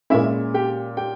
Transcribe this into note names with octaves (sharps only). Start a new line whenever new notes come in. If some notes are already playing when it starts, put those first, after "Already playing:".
A#2 G#3 C#4 E4 E5
G4 G5
G4 G5